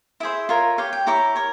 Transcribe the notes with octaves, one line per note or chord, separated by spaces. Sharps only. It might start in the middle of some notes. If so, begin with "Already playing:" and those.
E4 G#4 C5 E5
F4 A#4 C#5
G4 C#5 F5
G5
E4 G4 C#5 A#5
A#4 C#5